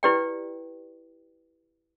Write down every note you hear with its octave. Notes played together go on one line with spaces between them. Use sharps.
E4 G4 B4 D5 G5